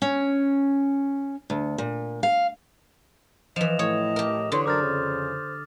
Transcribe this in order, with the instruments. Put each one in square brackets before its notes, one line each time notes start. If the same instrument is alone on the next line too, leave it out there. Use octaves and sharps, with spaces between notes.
[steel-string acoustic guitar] C#4
D2
A#2
F5
[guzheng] E3 F3 [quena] D#5 [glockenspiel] E7 F7
[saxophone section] A2 [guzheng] C#5 [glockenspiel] D#6
[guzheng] G4 A#4
[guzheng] D3 [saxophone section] E3 B4 C#5 [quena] C6
[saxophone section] F#2 D4 A#4 [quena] C5 [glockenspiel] D6 F6 A6
[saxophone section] F2 C#3